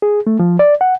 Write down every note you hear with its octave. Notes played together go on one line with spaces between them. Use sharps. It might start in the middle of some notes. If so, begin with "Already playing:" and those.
G#4
A3
F3
D5
F#5